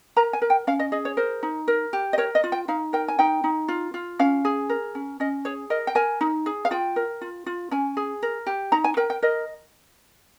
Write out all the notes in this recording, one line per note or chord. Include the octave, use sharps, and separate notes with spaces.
A#4 A#5
G#5
A#4
G5
C#4 F5
D#5
G#4 D#5
C#5
A#4 C5
D#4
A#4
G4
D#5
A#4 C#5
D#5
F4
G5
D#4 F5
A#4 G5
G#5
D#4 G5
D#4
F4
F4
C#4 F5
G#4
A#4
C#4
C#4 D#5
G#4 C#5
A#4 D#5
G5
A#4 G#5
D#4
G#4
F5
F4 G5
A#4
F4
F4
C#4 G#5
G#4
A#4
G4
D#4 A#5
G#5
A#4 G5
G5
A#4 D#5